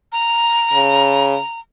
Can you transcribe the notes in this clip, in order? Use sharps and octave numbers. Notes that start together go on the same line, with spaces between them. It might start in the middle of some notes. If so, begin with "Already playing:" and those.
A#5
C#3